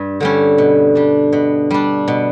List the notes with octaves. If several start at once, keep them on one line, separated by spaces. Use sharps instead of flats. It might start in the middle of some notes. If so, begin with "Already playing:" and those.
Already playing: G2
D3 G3 C#4
B2
G3 D4
B2
G3 D4
B2